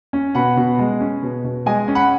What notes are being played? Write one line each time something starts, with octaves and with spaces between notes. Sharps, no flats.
C#4
B2 F#5 B5
B2
G#3
C#4
B2
B2
G#3 D#5 G#5
C#4
F#5 B5